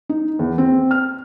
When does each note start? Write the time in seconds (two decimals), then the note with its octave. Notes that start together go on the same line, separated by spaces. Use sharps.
0.09 D#4
0.39 E2
0.58 C4
0.91 F6